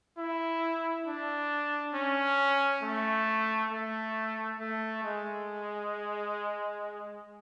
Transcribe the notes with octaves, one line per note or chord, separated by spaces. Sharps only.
E4
D4
C#4
A3
A3
A3
G#3